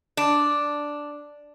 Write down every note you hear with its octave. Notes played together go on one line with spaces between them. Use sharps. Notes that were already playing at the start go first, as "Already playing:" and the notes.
D4